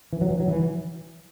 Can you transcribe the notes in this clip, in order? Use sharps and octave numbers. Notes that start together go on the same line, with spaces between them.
E3
F#3
E3
F#3
E3